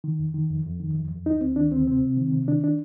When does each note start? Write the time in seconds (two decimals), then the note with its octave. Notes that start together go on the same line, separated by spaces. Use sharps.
0.04 D#3
0.19 F2
0.34 D#3
0.50 F2
0.66 F2
0.80 D#3
0.95 F2
1.11 F2
1.26 D2 D#4
1.41 D2 C4
1.56 D#3 D4
1.72 D2 C4
1.87 C3 C4
2.02 C3
2.17 D#3
2.33 C3
2.47 D#3 D4
2.64 D4